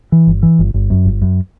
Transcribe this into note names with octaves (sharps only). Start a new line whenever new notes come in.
E3
G1
E3
G1
G1
F#2
G1
F#2